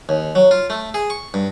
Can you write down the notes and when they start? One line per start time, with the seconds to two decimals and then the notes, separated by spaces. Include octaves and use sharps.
0.09 D#2
0.35 F#3
0.51 F4
0.70 A3
0.94 G#4
1.10 C#6
1.34 G2